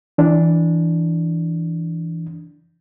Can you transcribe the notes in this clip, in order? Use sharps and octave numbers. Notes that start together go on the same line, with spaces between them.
E3 D4